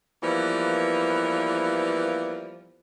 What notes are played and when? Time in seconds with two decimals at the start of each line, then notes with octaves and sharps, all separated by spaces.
0.23 E3 F3 G3 A#3 B3